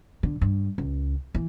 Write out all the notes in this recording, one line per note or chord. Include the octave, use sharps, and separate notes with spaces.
D3
G2
C#2
E3